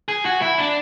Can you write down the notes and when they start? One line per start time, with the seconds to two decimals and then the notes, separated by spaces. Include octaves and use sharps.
0.08 G#4
0.25 F#4
0.42 E4
0.58 D4